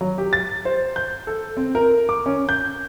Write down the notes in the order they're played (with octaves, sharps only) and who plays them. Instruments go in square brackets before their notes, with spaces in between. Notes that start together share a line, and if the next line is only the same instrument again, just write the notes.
[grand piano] F#3
G4
A6
C5
G6
A4
C4
A#4
D6
C#4
G6